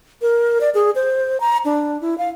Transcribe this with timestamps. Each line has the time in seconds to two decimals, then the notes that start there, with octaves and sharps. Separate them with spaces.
0.22 A#4
0.61 D5
0.74 G#4
0.95 C5
1.40 A#5
1.65 D4
2.01 E4
2.18 F5